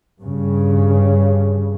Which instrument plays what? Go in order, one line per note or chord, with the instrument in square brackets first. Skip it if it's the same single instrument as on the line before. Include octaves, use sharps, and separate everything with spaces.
[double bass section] G2 C#3